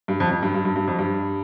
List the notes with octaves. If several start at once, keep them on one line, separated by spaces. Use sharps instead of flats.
G2
F2
F2
G2
G2
G2
G2
F2
G2